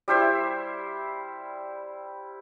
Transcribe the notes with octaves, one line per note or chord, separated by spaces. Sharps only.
G3 E4 C5 E5